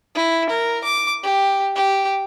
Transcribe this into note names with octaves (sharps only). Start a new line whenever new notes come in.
E4
A#4
D6
G4
G4